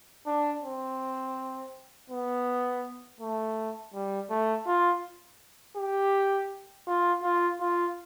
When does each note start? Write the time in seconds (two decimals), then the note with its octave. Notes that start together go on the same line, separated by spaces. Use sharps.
0.26 D4
0.63 C4
2.10 B3
3.20 A3
3.94 G3
4.30 A3
4.67 F4
5.77 G4
6.87 F4
7.24 F4
7.61 F4